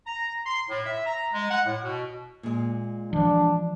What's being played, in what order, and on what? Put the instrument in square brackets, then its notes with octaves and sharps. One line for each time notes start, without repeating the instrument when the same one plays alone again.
[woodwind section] A#5
C6
A2
E5
A#5
G#3
F#5
A2
B2
[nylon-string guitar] A#2 G#3
[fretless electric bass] E3 F3 [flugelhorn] D4